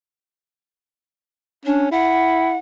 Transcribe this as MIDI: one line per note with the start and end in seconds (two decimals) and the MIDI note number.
1.66 1.89 61
1.66 1.88 62
1.92 2.56 64
1.92 2.57 78